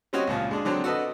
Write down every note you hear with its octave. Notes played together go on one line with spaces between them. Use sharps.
G3 C4 C#4 F#4 C#5 D#5
C#2 A#2 F3
G#3 D4 G#4
D3 F#3 C4 D4
F#4 A4 B4 D#5